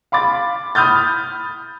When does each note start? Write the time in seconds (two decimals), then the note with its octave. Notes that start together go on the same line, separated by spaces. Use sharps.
0.12 F5 B5 D6 A6
0.75 B5 D#6 F6 G6 A6